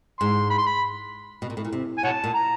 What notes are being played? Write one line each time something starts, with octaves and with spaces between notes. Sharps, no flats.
G#2 C6
B5
C6
B5
B2
A#2
A2
A#2
C3
G#5
B2 C#5 F#5 A5
A#2
A#5